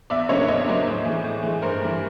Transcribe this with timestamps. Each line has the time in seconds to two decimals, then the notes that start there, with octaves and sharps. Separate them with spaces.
0.10 E2 D5 E5
0.29 C#3 F#3 A#3 D4 C#5 D#5
0.48 E2 C#5 D#5
0.68 C#3 F#3 A#3 D4 C5 D5
0.87 A2
1.05 E3 G#3
1.24 A2
1.43 E3 G#3
1.62 G2 A#4 C5
1.82 E3 G3